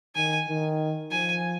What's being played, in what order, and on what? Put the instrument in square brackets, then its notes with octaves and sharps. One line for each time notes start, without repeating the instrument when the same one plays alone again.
[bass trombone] D#3 [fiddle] G#5
[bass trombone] D#3
[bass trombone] F3 [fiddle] G#5